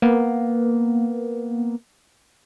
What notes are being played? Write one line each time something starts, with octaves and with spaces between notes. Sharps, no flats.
A#3 B3